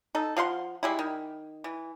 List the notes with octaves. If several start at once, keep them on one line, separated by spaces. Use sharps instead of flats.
D#4 A4
F3 F5 F#5 C6
G3 G#3 E4
D#3
E3